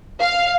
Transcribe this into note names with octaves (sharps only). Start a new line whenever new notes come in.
F5